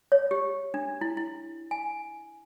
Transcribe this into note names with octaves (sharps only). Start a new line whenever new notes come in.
C#5
G4
D4
E4
E4
G#5